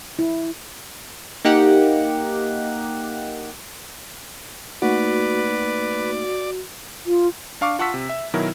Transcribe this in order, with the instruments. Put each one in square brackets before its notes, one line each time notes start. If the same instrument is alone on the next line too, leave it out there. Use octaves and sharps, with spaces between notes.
[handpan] E4
[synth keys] A#3 D#4 G4 F#5
[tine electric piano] A3 A#3 D#4 [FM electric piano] F#4 [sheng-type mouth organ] B4 [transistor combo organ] D5
[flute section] F4
[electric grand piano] D4 F5 C#6 D6
F4 F#5 A5 C#6 E6 B6
C3
E5
B2 D#3 F#3 E4 A#4